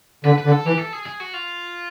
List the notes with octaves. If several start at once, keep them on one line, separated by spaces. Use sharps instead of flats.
D3 B4
B4
D3
A4
E3 G4
A4
G#4
G#4
F#4
F4